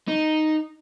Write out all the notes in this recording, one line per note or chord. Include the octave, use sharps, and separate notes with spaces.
D#4